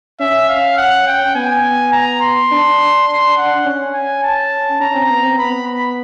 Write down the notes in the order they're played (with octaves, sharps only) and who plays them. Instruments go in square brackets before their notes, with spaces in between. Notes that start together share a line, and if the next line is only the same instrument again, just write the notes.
[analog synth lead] C#4 [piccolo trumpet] E5
[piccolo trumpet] F5
F#5
G5
[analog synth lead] B3 [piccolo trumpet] G#5
[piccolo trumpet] A#5
C6
[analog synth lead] D4
[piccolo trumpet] C6
F#5
[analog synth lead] C#4
[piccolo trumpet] G#5
A5
[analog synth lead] C#4 [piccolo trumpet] A#5
[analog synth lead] C4
B3
C4
[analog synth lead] B3 [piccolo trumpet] B5
[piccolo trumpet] B5